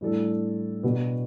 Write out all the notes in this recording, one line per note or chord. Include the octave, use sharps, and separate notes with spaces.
A2 G3 D4 A4
B2 B3 D4 G4 B4